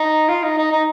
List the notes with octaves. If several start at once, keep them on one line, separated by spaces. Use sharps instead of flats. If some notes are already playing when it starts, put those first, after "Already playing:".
Already playing: D#4
F4
D#4
D#4
D#4